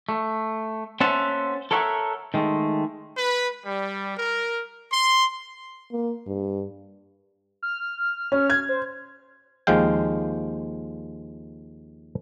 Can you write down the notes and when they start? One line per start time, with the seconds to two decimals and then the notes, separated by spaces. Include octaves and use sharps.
0.09 A3
1.00 A#3 C#4 C5 E5 F#5 A5
1.71 A4 A#4 C#5 E5 F#5
2.34 D#3 G#3 A3
3.18 B4
3.66 G3
4.18 A#4
4.93 C6
5.92 A#3
6.27 G2
7.63 F6
8.32 C#4
8.50 G#6
8.69 C5
9.67 D#2 F3 G#3 F5 G5